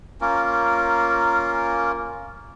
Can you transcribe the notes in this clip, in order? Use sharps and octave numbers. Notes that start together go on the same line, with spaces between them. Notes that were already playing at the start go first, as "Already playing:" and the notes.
A#3 C#4 F4 A#4